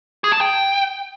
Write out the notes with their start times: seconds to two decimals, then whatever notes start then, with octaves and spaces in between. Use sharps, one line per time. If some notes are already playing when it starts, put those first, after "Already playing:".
0.24 G#4
0.32 A5
0.41 G5